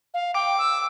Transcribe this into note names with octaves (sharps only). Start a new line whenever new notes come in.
F5
G5 D6
E6